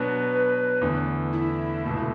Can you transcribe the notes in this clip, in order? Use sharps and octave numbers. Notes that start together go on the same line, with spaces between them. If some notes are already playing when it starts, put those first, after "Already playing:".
Already playing: B2 F#3 B3 D4 B4
E2 D3 A3
E4
C#2 B2 A3